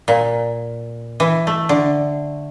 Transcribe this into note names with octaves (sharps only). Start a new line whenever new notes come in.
A#2
E3
A3
D3